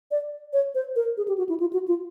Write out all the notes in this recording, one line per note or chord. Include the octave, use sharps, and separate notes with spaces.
D5
C#5
C5
A#4
G#4
G4
F#4
E4
F4
F#4
F4